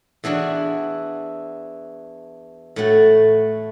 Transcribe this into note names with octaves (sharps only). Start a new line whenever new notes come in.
E2 E3 D4 F#4
A2 A3 F#4